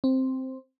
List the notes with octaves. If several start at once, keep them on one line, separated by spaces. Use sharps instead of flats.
C4